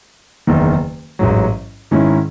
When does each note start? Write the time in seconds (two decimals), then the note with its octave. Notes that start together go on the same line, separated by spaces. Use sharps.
0.47 F#1 E2 D#3
1.19 A1 G#2 F#3
1.91 G#2 D#3 G#3 C#4 E4